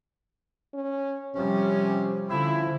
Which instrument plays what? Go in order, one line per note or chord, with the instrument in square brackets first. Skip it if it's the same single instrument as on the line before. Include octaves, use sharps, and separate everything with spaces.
[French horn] C#4
[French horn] C3 [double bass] F3 G3 [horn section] C#4
[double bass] D3 [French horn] F3 [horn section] C4 C#4 E4